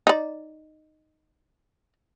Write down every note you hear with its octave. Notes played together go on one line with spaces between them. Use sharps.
D#4 D5